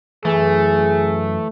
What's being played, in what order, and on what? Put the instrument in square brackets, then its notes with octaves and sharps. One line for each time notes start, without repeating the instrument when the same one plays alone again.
[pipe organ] F#2 [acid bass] E3 [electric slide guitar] A3 [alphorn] G#4